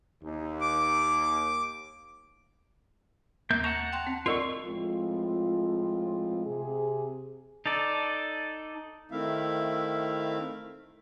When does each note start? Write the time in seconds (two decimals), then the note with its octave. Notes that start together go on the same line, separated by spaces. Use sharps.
0.23 D#2
0.61 D6
3.50 D#2 A#3 G6
3.64 F#5 A5 A#5 C#6
3.93 G5 C6 F#6
4.07 C4
4.26 F4 A4 A#4 D5 D#5 C#6
4.65 A2 F3 G#3 C4 F4
6.47 C3 G#4
7.66 D#4 A4 D5
9.12 D#3 A3 C4 E4 E5 F5